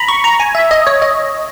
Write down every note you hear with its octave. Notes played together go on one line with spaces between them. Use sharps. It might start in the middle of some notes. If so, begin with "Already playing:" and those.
Already playing: A#5 B5
C#6
A#5
G#5
E5
D#5
C#5
D#5